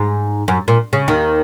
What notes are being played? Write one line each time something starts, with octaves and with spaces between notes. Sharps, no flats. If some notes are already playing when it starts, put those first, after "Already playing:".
Already playing: G#2
F#2
A#2
C#3
D#2 D#3